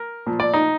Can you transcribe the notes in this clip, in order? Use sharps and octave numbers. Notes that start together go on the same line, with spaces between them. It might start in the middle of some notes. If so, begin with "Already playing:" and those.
Already playing: A#4
A#2 F3
D5
D#4